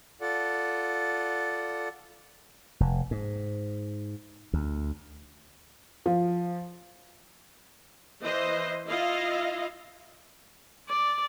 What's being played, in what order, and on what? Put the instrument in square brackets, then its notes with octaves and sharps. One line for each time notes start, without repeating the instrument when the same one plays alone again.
[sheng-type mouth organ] F4 A4 D5 F#5
[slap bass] F1
G#2
D2
[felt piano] F3
[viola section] E3 C5 D#5
E4 F4 D#5 F5
[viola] D5